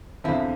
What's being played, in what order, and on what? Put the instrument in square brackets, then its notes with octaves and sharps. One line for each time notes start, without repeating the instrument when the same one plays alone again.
[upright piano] E2 D3 F3 C4 F4 [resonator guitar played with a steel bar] E4